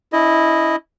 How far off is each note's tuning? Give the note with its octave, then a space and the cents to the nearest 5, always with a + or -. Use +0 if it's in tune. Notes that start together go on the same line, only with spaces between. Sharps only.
C#4 +40 E4 -10 D#5 +0